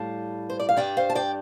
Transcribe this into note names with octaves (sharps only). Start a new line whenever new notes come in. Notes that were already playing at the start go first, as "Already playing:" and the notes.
Already playing: A2 G3 F5 A5
C5
D5
F5
G2 G3 D5 G5
C5 F5
A5
D5 G5